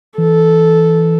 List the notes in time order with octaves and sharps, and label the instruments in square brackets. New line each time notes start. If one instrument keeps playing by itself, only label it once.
[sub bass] E3 [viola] A4